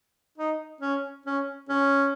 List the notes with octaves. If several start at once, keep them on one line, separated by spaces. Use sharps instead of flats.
D#4
C#4
C#4
C#4